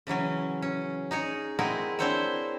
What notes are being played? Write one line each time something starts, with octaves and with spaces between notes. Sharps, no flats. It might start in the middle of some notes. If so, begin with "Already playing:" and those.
C#3 E3 F#3 C#4
C#4
D#4 G#4 C#5
G#3 C4 E4 F#4 G#4 A#4
C4 D4 E4 C5 C#5 E5